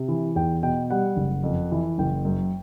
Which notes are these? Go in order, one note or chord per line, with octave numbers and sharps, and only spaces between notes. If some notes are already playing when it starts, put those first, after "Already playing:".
Already playing: C3
E3
E2 G5
B2 G5
G3 F#5
F#1
F2
E3
F#1 G5
F#2